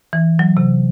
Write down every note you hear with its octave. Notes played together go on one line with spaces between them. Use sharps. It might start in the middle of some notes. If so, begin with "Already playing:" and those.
E3
F#3
C3